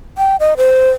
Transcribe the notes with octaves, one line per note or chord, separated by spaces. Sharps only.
G5
D#5
C5